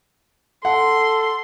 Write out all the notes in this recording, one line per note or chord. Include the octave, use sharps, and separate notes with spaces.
A4 F#5 C6